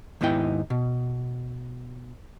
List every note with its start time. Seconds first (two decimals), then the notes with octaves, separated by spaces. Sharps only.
0.21 D#2 G#2 B3 D#4 E4 G5
0.70 B2